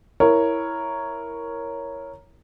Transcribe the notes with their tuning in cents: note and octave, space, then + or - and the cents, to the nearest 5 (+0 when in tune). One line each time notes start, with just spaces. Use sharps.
E4 +0 A#4 +0 C#5 +0